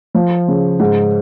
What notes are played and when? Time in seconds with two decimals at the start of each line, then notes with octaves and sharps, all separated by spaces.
0.15 F3
0.48 C#3
0.80 G#2